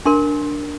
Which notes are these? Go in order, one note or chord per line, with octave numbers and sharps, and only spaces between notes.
D4 A#4 C6